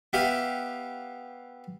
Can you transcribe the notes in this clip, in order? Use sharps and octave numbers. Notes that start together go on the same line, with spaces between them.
B3 G4 E5 F5 G5